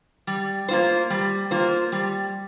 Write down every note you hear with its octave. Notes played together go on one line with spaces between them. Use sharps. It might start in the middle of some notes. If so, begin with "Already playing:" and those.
G3
A#3 F4 C5
G3
A#3 F4 C5
G3